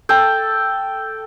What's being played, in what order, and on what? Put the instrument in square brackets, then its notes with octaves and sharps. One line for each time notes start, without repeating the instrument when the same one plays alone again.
[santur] A4 G5 A5